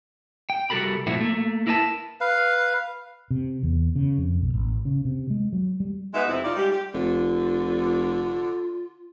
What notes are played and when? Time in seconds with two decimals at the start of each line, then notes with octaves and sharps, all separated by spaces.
0.50 G5
0.70 C2 G3 F#4 A4 A#4 B5
1.07 A#2 F3 A3 C4 E4 F#4
1.21 A3 A#3
1.67 E4 A#4 B4 D#5 A5
2.21 B4 F5
3.31 C3
3.63 E2
3.96 C#3
4.18 F2
4.42 B1
4.54 A1
4.85 C#3
5.05 C3
5.30 G#3
5.53 F#3
5.80 G3
6.14 G#3 B3 D#4 F#4 B4 E5
6.29 F2 C3 C4 E4
6.44 D#4 F4 D5
6.56 G3 G#3 G4
6.72 G4
6.94 F1 D3 F4